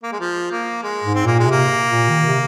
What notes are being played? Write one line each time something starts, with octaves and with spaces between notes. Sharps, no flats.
A#3
G#3
F3
A#3
G#3
G#2
C4
A#2 A#3
G#3
C3 A#3
A#2
D#3
C3